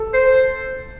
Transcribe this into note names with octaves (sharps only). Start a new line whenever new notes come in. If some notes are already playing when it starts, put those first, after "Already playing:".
Already playing: A4
C5